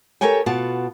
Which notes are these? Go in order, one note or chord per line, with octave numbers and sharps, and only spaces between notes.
G4 A4 A#4 C#5 G5 G#5
B2 B3 F4 A5